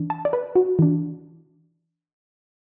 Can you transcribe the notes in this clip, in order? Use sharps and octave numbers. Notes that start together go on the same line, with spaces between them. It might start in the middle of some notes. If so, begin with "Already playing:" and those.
Already playing: E3 D4
A5
D5
B4
F#4
E3 D4